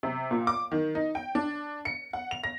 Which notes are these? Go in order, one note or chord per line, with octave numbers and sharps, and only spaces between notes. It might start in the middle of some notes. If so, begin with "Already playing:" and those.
C3
A#2
D6
D#3
D#4
G5
D4
C#7
F#5
F7
A#6